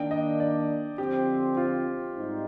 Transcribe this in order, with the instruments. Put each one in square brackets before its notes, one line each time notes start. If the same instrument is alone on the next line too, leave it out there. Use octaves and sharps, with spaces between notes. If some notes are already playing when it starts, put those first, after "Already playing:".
Already playing: [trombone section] D#3 A#3 D4 [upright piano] G5
[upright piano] D#5
D5
[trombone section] D3 F3 C4 [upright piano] G4
[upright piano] F4
[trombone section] G#2 G3 C4 D#4